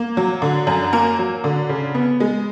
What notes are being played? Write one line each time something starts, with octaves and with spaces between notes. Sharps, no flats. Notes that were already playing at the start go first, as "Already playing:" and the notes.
Already playing: A#3
F#3
D3
F#2
A#3 A#4
F#3
D3
C#3
B3
G#3